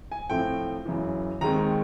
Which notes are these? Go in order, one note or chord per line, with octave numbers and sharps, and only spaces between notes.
G#5
A2 F3 A3 C4 G5
F#2 C#3 E3
D#2 D#3 G#3 C4 A#5